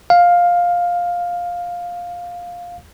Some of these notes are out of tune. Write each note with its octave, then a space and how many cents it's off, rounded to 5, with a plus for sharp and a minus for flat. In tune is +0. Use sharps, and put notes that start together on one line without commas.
F5 +10